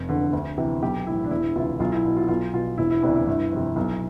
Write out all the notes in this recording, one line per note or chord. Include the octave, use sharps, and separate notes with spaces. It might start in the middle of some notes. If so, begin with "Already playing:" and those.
Already playing: F1
E2 D3
D2
C3 E3
B1 G4
A2 E3 E4
D4
E1 E4
D2 C3 E3 F4
B1 F4
E4
B2 E4
F4
B1 F4
B2 F4
E1 E4
E4
D2 C3 E3 D4
E4
G1
F2 C3
B1